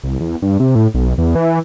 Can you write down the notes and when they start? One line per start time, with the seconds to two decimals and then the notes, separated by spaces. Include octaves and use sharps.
0.04 C2
0.20 E2
0.42 G2
0.60 C3
0.75 A2
0.94 B1
1.18 E2
1.35 E3